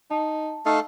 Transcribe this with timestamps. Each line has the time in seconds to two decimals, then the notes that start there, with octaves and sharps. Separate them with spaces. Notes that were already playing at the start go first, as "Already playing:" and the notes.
0.10 D#4 A5
0.66 A3 D#4 A4 F5